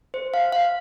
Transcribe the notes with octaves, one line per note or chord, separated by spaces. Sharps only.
C5
F5
F5